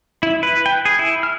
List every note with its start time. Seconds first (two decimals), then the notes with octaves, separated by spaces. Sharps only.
0.23 E4
0.43 B4
0.66 G5
0.85 G#4
0.99 E4
1.23 F6